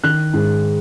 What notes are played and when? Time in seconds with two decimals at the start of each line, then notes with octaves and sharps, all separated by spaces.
0.04 D#3 F#6
0.34 G#2